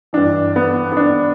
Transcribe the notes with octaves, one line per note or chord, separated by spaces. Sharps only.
G2 E3 D4
B3
B3
D4